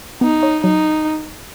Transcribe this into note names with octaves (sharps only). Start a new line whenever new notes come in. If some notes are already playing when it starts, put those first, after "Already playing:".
B3 D#4
C#5
F#3 D#4